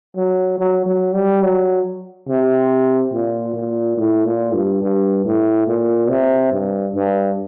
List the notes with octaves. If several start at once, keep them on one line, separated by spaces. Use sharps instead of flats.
F#3
F#3
F#3
G3
F#3
C3
A#2
A#2
A2
A#2
G2
G2
A2
A#2
C3
G2
G2